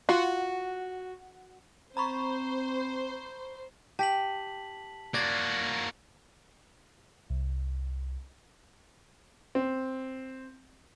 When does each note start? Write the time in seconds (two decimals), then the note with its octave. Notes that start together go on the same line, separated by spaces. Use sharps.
0.09 F4 F#4
1.97 C4 C5 A#5 B5 C#6
3.99 G4 A5 B6 F#7
5.14 A#3 F#4 D5 G#6 A6
7.30 C2
9.55 C4